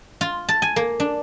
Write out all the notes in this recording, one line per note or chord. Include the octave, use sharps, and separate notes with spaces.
F4
A5
G#5
A#3
D4